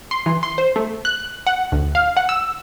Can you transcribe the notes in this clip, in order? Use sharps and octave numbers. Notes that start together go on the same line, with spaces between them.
C6
E3
C6
C5
A3
F#6
F#5
D2
F5
F#5
E6